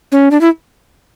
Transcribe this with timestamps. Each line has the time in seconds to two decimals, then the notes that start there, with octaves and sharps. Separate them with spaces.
0.12 C#4
0.31 D4
0.41 E4